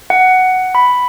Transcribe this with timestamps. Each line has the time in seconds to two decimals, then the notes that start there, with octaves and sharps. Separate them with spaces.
0.10 F#5
0.75 B5